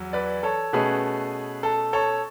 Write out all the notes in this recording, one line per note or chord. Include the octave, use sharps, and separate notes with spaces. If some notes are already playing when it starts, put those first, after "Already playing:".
Already playing: E2 F#3
B4 D5
A4 C#5
B2 A3 C#4 G#4 B4
A4
A4 C#5